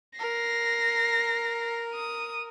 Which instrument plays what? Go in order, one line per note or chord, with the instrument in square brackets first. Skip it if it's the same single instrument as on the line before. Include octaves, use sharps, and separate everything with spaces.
[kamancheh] A#4 [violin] A#6 C7
[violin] D#6